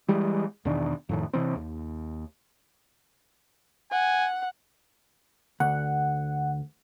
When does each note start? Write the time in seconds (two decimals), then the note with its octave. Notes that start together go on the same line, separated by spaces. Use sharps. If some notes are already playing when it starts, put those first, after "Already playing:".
0.08 E3 G3 G#3
0.65 E2 B2 D#3 D4
1.09 F2 A2 D#3
1.33 C3 E3 C4
1.56 D#2
3.92 F#5 G#5
5.60 D2 F#5